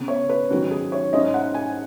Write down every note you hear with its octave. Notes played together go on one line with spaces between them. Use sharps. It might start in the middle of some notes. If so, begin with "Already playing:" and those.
Already playing: C#3 B3
C#5
B4
G#2 D#3 F#3 C#4 F#4
G#4
C#5
G#2 G#3 C#4 D#5
F#5
G#5